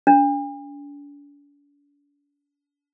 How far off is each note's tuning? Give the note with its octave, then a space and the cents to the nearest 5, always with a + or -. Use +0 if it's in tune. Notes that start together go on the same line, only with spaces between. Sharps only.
D4 -45